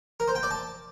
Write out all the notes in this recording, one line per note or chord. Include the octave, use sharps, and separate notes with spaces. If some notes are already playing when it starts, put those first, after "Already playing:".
A#4
C5
G5
D5
A5